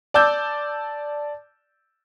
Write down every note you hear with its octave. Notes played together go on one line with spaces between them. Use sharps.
D5 A5 D6 E6 G6